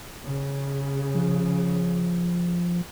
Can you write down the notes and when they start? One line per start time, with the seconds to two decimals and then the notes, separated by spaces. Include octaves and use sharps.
0.23 C#3
1.15 F3